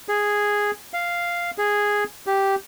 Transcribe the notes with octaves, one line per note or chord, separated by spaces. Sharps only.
G#4
F5
G#4
G4